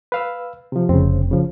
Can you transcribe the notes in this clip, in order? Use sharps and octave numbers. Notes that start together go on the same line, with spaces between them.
B4 F5 E6
C3 F3
F1 C#3 C4
C#3 F3